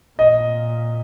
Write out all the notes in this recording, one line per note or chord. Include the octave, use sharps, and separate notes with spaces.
A#2 D#5